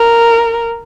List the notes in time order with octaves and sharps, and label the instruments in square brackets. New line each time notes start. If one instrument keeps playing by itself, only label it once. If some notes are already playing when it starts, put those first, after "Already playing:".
Already playing: [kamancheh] A#4